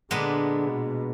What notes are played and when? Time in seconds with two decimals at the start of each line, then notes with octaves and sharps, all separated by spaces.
0.11 A#2 D3 G#3 B3 D4
0.69 B2